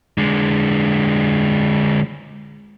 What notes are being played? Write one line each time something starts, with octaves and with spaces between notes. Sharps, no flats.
D3 G#3